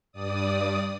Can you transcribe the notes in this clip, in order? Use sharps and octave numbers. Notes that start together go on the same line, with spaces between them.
G2 D5 D#6